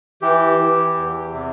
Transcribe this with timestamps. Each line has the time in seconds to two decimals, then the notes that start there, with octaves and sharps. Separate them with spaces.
0.22 E3 G4
0.59 E3
0.96 E2
1.33 C3